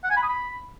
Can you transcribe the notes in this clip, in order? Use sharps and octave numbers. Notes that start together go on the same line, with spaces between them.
F#5
G#5
B5
D#6
B5